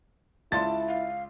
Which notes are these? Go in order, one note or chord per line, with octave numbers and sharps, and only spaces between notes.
C#2 E4 D5 A5 C6 A6
F5